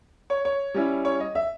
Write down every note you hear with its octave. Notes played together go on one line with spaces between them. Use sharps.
C#5
C#5
G3 C#4 E4
C#5
D#5
E5